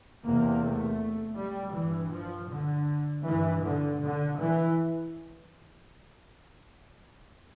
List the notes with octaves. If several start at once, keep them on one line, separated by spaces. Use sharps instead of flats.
E2 C3 A#3
A3
G3
G2 E3
F3
D3
G2 E3
D3
D3
E3